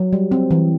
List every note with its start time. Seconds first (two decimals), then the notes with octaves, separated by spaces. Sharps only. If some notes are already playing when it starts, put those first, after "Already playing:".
Already playing: F#3
0.13 G3
0.31 C4
0.51 E3